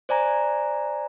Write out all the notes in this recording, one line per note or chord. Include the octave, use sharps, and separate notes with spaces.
C5 D5 G#5 A#5